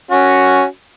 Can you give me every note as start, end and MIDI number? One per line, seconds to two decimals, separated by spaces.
0.11 0.64 61
0.11 0.64 66